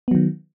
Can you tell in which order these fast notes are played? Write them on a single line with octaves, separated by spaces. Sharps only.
B3 F#3 D#3